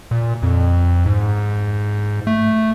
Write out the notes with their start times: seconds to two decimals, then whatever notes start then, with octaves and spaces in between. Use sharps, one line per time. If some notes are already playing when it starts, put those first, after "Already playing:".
0.11 A#2
0.43 F2
1.06 G#2
2.27 A3